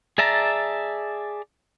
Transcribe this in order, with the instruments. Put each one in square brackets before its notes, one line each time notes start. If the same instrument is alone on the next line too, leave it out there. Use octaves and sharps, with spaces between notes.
[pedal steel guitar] G#4 D5 E5 A5 A#5